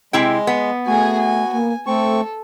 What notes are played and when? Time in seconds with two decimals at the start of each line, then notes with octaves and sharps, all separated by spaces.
0.13 C3 G#3 E4 G5
0.47 B3
0.87 A3 F#4 G#4 G#5
1.19 G#5
1.52 A#3 G#5
1.87 A3 C4 A4 C#6